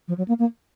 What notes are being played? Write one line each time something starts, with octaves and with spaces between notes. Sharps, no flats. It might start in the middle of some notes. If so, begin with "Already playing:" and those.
F3
F#3
A#3
A#3